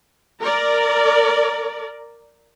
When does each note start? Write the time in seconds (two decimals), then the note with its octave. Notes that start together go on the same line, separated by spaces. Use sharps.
0.41 A#4 D5